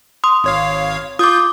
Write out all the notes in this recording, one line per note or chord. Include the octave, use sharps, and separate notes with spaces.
C6 D#6
G#1 C#5 F5
F4 D6 D#6 G6